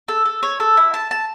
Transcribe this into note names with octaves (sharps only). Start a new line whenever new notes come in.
A4
A4
C#5
A4
E4
A5
A5